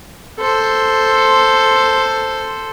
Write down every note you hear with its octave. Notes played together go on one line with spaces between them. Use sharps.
A4 C5